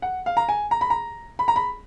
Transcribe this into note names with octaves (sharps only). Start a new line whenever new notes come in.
F#5
F5
A#5
G#5
A#5
B5
A#5
B5
A#5
B5